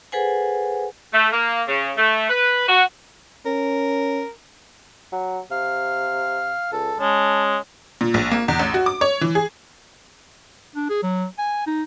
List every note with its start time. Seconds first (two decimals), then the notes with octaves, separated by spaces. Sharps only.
0.12 G#4 A4 B4 C5 F#5 G#5
1.14 A3
1.32 A#3
1.68 C#3
1.97 A3
2.30 B4
2.68 F#4
3.46 C#4 A#4
5.12 F#3
5.51 C3 F5
6.72 C#2 A4
7.00 G#3 C#4 A5
8.01 A#2
8.14 A#1
8.31 A#3
8.48 E2
8.59 A1
8.74 F#4
8.86 D6
9.01 C#5
9.21 E3
9.35 G#4
10.76 D4
10.90 G#4
11.03 F#3
11.38 G#5
11.67 D#4